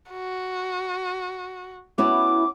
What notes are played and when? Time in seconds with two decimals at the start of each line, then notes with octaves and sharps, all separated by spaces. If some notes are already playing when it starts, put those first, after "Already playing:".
0.11 F#4
1.98 B3 C#4 E4 F#4 D6